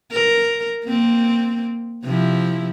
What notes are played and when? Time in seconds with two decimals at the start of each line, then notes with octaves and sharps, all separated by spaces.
0.11 A#4
0.84 A#3 C4
2.04 C3 F3 E4